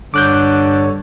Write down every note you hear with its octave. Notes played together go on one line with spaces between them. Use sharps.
G2 D3 C#5 D6 F#6 G6